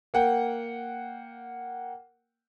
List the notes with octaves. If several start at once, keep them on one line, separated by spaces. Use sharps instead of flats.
A#3 F#5 G5